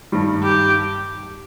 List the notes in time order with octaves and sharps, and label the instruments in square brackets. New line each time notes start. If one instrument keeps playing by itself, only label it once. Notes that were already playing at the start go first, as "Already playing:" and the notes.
[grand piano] G2 D#3 G3
[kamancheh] G4